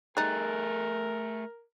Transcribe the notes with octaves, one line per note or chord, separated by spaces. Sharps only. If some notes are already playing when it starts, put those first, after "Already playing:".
G3 A3 D#4 G#4 A#4 F#6 A6